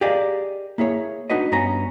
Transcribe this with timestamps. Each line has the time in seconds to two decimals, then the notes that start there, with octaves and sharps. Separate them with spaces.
0.01 G4 G#4 A#4 D5 D#5 F5
0.78 A#3 E4 G#4 C#5
1.30 D4 D#4 F#4 B4 D#5
1.52 G2 B3 C#4 A#5